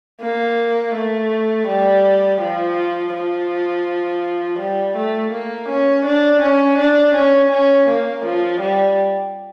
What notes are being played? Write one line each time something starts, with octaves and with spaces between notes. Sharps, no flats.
A#3
A3
G3
F3
F3
G3
A3
A#3
C#4
D4
C#4
D4
C#4
C#4
A#3
F3
G3